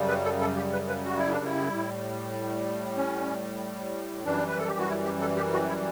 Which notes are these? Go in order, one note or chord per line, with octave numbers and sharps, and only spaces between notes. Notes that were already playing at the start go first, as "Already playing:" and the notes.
Already playing: F#2 C#3 G3
B4
A4
A4
G4
B4
B4
F#4
E4
D4
E4
A2 G3
C#4
F#2 E3 G3 D4
B4
A4
G4
F#4
E4
G4
A4
G4
F#4
E4